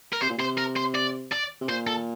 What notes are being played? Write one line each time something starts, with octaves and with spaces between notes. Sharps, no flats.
A#4
C3 C5
A#2
C3 C5
A#4
C5
D5
D5
C3
A#2 C5
A4